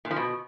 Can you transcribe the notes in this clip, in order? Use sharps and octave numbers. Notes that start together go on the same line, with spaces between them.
A#2
F3
B2